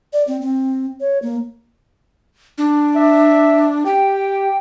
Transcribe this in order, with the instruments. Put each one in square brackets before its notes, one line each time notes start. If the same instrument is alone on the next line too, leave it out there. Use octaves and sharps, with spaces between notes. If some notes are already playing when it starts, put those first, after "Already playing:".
[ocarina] D5
C4
C4
C#5
A#3
[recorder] D4
[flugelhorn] E5
[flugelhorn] G4 [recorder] G5